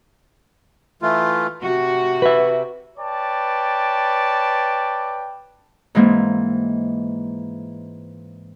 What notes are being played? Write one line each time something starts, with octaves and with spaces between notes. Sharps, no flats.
E3 A3 F4
C3 F#4
B4 E5
B4 C#5 D5 G5 A5
G#2 E3 G#3 A#3 C4